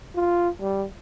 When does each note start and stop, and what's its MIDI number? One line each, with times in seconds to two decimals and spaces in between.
0.15 0.49 65
0.61 0.85 55